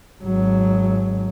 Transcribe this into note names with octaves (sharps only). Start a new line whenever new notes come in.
G#1 F#3